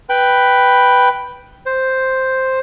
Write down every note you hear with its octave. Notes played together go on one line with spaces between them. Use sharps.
B4 G5 B5
C5